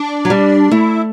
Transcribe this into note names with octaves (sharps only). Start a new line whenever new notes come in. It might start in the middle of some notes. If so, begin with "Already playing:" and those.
Already playing: D4
F#3
G3
A3 E4